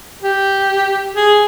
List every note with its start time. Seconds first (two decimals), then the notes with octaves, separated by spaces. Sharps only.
0.22 G4
1.15 G#4